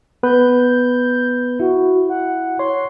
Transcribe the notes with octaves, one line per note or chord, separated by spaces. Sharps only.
B3 B4 G6
E4 F#4
F#5
C#5 C6